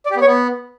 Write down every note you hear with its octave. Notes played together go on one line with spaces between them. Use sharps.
D5
G4
B3
C#5
B3